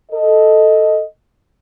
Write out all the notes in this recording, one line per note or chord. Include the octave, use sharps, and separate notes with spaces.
A4 D#5